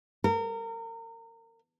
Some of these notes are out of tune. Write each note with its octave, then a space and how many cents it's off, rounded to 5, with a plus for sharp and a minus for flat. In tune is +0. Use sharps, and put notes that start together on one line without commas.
A#4 -30